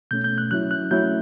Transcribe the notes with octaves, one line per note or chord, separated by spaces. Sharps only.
B2 A3 C#4 G6
G6
F#6
F#3 C#4 E4 F#6
F#6
F#3 A3 C#4 E4 G6